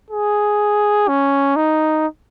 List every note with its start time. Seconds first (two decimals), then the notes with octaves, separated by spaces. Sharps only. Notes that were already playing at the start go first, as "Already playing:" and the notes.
0.10 G#4
1.08 C#4
1.56 D#4